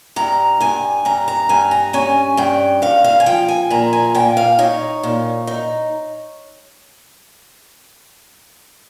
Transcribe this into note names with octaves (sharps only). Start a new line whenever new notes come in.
G2 A#5
G2 G#5
G2 A#5
A#5
G2 G#5
A#5
C#4 G#5
G2 G5
G2 F5
F5
G#5
F3 G5
G#5
A#2 A#5
G#5
A#2 G5
F5
D#4 C#5
A#2
D#4